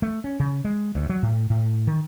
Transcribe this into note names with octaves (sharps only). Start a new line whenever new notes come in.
A3
C#4
C#3
G#3
D2
F#3
A2
A2
D#3